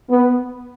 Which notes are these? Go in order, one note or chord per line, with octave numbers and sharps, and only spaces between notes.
B3